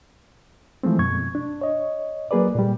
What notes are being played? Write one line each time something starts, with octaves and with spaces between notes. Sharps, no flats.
E3 F3 G#3 A3 C4
F#2 B2 C#6 G#6
D4
C#5 D#5
F#3 A#3 G#4 B4 D5
A#2 G3